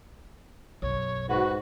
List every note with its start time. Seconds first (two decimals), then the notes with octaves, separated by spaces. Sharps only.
0.82 B1 F#2 C#5
1.29 G#2 F#4 B4